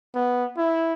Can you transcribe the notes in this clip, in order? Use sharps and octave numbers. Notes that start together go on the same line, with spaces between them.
B3
E4